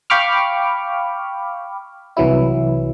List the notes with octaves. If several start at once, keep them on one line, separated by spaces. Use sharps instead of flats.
F5 G5 B5 C#6 D6 F6
C2 E3 F#3 E4